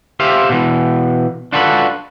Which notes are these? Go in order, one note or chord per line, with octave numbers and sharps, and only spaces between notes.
G4 C5 E5 F5
B2 E3
D4 F4 F#4 A4 B4